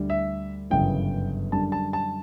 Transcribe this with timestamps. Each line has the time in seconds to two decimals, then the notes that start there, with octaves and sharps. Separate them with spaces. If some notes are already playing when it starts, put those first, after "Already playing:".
Already playing: D2 D3 G3
0.10 E5
0.70 G1 F#2 C#3 E3 G5
1.52 F#2 D3 G3 A5
1.72 A5
1.93 A5